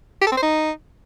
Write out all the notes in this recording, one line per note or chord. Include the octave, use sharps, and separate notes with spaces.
G4
A4
C4
C5
D#4